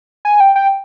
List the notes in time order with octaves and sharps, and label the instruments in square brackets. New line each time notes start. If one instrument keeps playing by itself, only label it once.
[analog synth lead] G#5
G5
G5